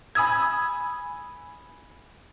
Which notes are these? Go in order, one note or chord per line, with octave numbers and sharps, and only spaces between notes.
G#5 B5 D#6 E6 G#6